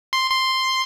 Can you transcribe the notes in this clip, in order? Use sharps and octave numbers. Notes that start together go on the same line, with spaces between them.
C6
C6